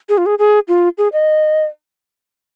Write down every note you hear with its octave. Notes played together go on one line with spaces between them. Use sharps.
G#4
F4
G#4
G#4
F4
G#4
D#5